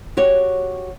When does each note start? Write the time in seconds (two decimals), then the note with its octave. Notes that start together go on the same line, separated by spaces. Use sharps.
0.17 F#4 G4 C#5